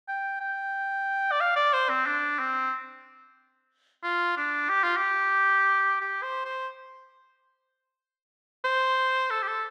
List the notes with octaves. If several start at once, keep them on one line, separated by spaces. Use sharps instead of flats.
G5
G5
D5
F5
D5
C5
C4
D4
C4
F4
D4
G4
F4
G4
G4
C5
C5
C5
A4
G4
A4